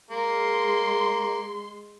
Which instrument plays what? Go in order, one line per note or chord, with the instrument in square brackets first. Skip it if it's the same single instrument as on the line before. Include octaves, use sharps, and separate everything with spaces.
[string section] G#3 C6 [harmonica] A#3